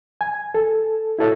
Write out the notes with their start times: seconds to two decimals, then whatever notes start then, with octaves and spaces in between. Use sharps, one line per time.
0.21 G#5
0.54 A4
1.19 E4 F#4 A4 C#5 E5